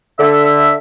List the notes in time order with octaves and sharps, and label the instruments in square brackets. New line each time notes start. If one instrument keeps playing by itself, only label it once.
[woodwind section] D3 E5